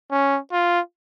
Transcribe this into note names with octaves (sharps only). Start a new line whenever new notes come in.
C#4
F4